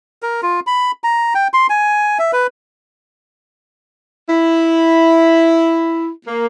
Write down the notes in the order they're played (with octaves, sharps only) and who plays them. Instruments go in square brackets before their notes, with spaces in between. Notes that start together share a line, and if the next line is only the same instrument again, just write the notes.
[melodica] A#4
F4
B5
A#5
G5
C6
G#5
E5
B4
[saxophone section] E4
A#3